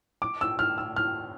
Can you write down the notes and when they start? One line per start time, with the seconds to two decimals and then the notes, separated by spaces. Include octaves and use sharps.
0.22 D6
0.41 E6
0.59 F6
0.78 E6
0.96 F6